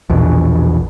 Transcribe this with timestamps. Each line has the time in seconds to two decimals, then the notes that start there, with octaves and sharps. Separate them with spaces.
0.10 A#1 E2 B2